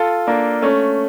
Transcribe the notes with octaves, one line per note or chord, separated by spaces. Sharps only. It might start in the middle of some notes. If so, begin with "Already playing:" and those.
Already playing: F4 A4
A#3 D4
A3 C#4